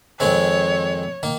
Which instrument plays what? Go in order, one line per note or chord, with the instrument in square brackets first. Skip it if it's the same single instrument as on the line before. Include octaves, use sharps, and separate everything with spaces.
[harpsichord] F2 D#3 G#3 C4 [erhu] C#5
[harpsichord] D#3 A#3